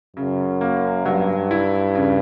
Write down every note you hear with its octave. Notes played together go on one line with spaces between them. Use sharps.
F#2 C#3
A#3
G2 F#3
E4
C#3